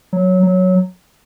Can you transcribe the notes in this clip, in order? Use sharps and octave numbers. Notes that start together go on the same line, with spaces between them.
F#3
F#3